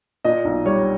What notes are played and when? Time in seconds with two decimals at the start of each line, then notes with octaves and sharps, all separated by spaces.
0.25 A#2 D#5
0.45 B1
0.65 G3 C#5